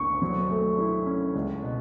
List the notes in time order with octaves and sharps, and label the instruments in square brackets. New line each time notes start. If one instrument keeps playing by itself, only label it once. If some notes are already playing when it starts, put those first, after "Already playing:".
Already playing: [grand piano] D2 [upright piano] C#6
[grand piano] F#3
A3
E4
C#4
C#2
B2